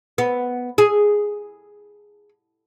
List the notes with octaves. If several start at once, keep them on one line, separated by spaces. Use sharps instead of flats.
B3
G#4